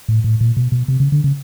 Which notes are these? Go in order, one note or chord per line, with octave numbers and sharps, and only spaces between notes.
A2
A2
A#2
B2
B2
C3
C#3
D3
C#3